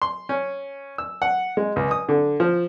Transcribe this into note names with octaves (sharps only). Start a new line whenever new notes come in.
C6
C#4
E6
F#5
G#3
C#2
D#6
D3
F3